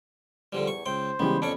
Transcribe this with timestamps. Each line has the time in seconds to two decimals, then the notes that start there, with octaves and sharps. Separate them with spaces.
0.52 E2 D3 F3 G3
0.67 C#6
0.86 C#2 C5 G5
1.19 C#3 E3 G3 G#3 B3 G4
1.42 F2 C#4 D4 C#6 D7